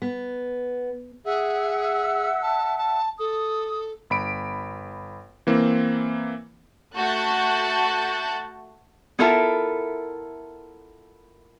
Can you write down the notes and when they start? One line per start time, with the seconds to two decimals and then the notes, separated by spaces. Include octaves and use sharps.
0.02 B3
1.25 G#4 E5 F#5 E6
2.42 A5
2.78 A5
3.19 A4 D#6
4.10 G1 B5 D7
5.47 E3 A#3 C4
6.96 A3 F#4 A5 F#6 G6 A6
9.19 B3 E4 F4 A4 A#4 E5